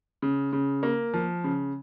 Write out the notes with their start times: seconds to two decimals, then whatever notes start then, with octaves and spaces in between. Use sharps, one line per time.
0.22 C#3
0.53 C#3
0.83 A#3
1.14 F3
1.44 C#3